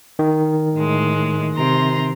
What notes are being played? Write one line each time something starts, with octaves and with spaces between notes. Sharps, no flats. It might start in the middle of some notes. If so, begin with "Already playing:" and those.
D#3
A2 G#3
C3 A#5 C6